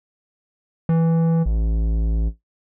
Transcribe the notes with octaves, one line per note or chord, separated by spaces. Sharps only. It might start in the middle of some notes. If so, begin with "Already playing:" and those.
E3
A1